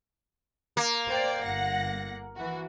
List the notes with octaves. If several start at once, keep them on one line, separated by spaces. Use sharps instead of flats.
A#3
C5 D5 G5
G1 F#5 A#6
E3 F#4